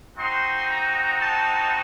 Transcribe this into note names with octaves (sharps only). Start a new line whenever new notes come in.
C4 D#4 F#4 C6
A#5
A5